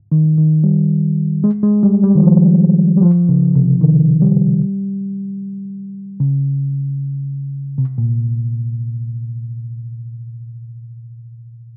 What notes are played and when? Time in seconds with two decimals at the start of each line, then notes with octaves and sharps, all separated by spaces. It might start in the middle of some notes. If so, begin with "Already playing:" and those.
0.12 D#3
0.38 D#3
0.64 G3
1.44 G#3
1.63 G#3
1.83 G3
2.04 G3
2.15 D#3
2.23 F3
2.97 G3
3.02 F3
3.29 C#3
3.55 C3
3.81 D#3
4.22 G3
6.20 C#3
7.78 C3
7.98 A#2